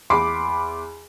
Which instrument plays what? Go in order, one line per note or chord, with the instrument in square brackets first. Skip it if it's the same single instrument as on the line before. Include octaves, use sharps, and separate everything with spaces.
[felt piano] E2 B5 C6 D6 C7